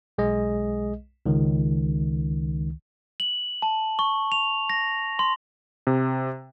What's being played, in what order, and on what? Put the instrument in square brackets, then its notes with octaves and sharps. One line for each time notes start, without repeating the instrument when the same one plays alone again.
[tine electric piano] B1 G#3 G#4 D#5
C#2 D#3
[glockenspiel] F#7
A5
C#6
F7
A#6
C6
[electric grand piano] C3